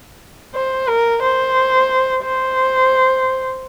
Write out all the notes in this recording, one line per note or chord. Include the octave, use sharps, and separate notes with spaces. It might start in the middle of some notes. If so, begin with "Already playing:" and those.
C5
A#4
C5
C5